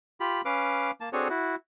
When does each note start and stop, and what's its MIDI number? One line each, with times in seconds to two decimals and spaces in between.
0.20 0.41 65
0.20 0.41 67
0.20 0.41 83
0.45 0.91 61
0.45 0.91 71
0.45 0.91 77
0.45 0.91 86
1.01 1.09 58
1.01 1.09 81
1.13 1.28 60
1.13 1.28 62
1.13 1.28 66
1.13 1.28 68
1.13 1.28 69
1.13 1.28 73
1.30 1.55 64
1.30 1.55 66